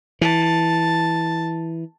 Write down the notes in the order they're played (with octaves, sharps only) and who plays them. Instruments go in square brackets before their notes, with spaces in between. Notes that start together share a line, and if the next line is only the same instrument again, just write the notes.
[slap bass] E3 [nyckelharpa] A5